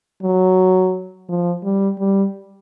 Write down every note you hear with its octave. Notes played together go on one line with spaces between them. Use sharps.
F#3
F3
G3
G3